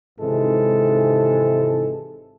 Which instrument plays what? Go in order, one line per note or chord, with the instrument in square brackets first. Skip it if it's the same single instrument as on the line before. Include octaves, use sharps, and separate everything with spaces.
[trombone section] G#1 G#2 C3 E3 G#3 A4